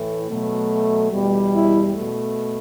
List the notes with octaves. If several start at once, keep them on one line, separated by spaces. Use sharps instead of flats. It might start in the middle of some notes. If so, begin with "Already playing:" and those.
Already playing: A2 E3 A3
B2 F#3 A3
E2 B2 G3
E4
B2 A3